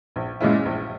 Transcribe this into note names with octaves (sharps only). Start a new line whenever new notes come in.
A#1
A#2 G#3 C#4 E4
A#1